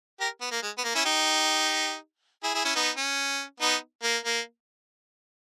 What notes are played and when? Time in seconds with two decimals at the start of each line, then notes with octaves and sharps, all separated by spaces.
0.20 G4 A#4
0.41 B3
0.52 A#3
0.63 G#3
0.78 B3
0.84 A#3
0.95 C#4 E4
1.05 D#4 G4
2.43 E4 G#4
2.54 E4 G#4
2.65 C#4 E4
2.75 B3 D#4
2.97 C#4
3.60 B3 D#4
4.03 A#3
4.25 A#3